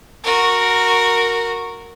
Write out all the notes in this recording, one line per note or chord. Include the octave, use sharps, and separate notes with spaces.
F#4 A#4